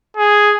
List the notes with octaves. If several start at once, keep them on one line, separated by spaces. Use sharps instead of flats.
G#4